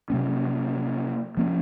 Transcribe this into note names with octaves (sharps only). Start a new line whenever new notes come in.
C3 F#3 A#3 C#4
F3 A#3 C#4